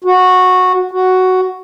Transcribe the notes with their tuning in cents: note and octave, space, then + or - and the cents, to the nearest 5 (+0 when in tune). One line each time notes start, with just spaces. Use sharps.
F#4 -10
F#4 +5